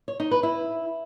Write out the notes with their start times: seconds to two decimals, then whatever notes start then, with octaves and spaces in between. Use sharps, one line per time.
0.08 C#5
0.20 D#4
0.31 B4
0.43 E4